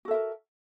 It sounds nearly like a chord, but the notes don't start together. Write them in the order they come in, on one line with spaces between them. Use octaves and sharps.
F#4 A4 E5 A#4